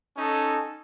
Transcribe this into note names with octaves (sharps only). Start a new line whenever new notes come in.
C#4 D#4 A4